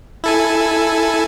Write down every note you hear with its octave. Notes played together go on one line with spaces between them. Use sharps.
E4 A4 G#5